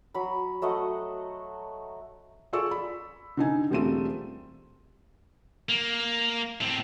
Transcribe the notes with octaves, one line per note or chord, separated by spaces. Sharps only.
F#3 B5
F#3 A3 D#5 F#5
F4 G#4 A4 D5 C#6 E6
B5
D3 D#4 G#5
E1 G3 A3 C4 F4 D#7
A#3
A2 C4